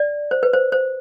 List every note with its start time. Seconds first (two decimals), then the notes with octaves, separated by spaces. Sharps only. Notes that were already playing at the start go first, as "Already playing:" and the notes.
Already playing: D5
0.31 C5
0.43 B4
0.53 C5
0.72 C5